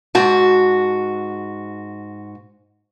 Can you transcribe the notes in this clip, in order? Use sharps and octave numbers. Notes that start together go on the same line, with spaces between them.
G#2 F#4 A5